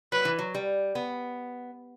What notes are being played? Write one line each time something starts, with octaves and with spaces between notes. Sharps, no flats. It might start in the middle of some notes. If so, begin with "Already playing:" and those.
F#3 B4
E3
F#3
G3
B3